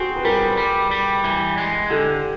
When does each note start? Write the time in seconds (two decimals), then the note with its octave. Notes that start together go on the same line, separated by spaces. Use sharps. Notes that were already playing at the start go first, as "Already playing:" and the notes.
Already playing: C4 F#4 G#4
0.16 B4
0.25 G3 G#4 A#4
0.57 G3
0.91 G3
1.24 E3
1.58 G#3
1.90 D3 G4 A4